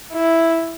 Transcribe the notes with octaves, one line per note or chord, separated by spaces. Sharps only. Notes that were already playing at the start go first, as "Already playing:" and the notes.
E4